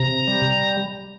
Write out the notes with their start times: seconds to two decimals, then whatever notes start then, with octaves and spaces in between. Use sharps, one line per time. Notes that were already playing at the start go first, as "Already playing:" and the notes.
Already playing: C3 A#5
0.28 G3